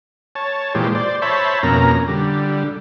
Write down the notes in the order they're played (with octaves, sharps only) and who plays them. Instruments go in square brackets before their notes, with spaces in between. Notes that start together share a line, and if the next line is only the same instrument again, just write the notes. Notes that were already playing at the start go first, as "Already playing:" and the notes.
[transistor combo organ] C#5 A5
A#2 E3 G#3 G4 C5
C5 D5
C5 C#5 E5 A5 B5
F2 B2 A#3 C#4 A#5
D3 G3